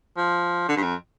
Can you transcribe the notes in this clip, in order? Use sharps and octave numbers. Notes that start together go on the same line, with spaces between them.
F3
D3
G2
F2